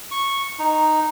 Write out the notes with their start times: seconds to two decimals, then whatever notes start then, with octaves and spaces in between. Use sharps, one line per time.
0.11 C#6
0.59 D#4